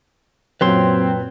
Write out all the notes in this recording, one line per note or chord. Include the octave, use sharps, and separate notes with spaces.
F#2 A#2 F#3 C4 B4 C#5 C6